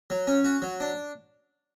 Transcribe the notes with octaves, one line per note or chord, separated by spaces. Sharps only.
F#3
C#4
F#4
F#3
D4